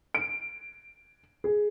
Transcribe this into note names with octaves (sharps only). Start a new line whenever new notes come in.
D7
G#4